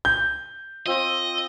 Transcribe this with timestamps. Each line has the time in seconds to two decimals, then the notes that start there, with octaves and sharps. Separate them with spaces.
0.05 G6
0.86 C4 F4 D#5